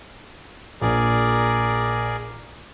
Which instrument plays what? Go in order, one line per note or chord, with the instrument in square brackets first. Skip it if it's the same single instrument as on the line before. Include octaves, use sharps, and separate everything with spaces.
[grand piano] A#1 [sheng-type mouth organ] G#4 A#4 D5